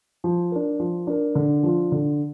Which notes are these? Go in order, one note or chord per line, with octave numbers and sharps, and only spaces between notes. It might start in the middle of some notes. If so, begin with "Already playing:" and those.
F3
D4 A#4
F3
D4 A#4
D3
F3 D4 F4
D3